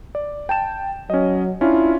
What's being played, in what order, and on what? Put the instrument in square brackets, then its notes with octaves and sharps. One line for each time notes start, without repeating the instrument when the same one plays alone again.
[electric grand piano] D5
G5 A5 E7
[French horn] F#3 [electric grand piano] C#4 D#5
[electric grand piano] C#4 D4 F4 [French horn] E4